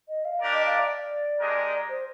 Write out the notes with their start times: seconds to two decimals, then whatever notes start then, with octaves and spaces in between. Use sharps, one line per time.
0.09 D#5
0.25 F5
0.42 D4 G4 A#4 D5
0.54 D#5
0.66 F5
0.79 D5
1.40 G#3 D4 G4 A#4 D#5
1.89 C5